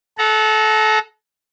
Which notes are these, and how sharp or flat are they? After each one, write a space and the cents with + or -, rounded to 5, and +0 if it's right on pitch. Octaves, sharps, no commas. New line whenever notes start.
A4 -25 F#5 +0 A#5 +0